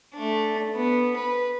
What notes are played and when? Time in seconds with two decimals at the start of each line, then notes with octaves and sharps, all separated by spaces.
0.14 A3 D4
0.75 B3
1.16 B4